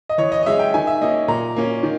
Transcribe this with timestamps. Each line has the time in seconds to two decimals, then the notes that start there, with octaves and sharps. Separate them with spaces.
0.09 D#5
0.18 E3 C#5
0.32 D#5
0.43 D#5
0.46 G#3 C#4 E5
0.59 G5
0.74 D#3 G#5
0.87 E5
1.01 A#3 C#4 D#5
1.28 A#2 A#5
1.56 A#3 C#4
1.83 D#3